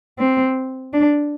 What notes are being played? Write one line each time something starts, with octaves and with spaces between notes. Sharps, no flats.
C4
D4